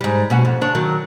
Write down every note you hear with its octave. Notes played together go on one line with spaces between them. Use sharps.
G#2 G3
B2 C#4 F#4
F2
C#3 D4 C#5
D#3 F#3